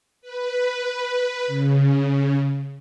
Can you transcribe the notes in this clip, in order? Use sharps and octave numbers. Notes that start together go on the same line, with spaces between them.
B4
C#3